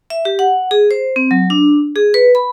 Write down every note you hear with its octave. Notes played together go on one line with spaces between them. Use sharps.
E5
G4
F#5
G#4
C5
C4
F#3
D4
G#4
B4
B5